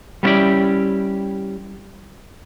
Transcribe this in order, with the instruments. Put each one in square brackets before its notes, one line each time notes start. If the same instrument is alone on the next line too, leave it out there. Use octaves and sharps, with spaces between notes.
[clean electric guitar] G3 B3 C#4 E4 G4 D5